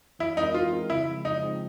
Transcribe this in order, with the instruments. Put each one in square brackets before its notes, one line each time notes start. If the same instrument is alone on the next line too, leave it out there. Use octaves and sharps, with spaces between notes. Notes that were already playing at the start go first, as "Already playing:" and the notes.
[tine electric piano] E3 [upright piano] E4
[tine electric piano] G#3 C4 F4 A#4 [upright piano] D#4
[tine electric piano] E3 [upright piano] F4
[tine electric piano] G#3 C4 F4 A#4
[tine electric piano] C#3 [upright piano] E4
[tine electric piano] F3 G#3 C4
[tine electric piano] C#3 [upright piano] D#4
[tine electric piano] F3 G#3 C4